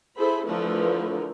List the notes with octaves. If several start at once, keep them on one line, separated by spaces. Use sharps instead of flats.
E4 G#4 A4 C5 B5
D3 E3 F3 A3 A#4 B4